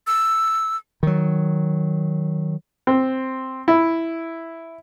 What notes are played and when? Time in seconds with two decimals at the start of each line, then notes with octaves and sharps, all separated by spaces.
0.07 E6
1.03 D#3 F#3
2.87 C4
3.68 E4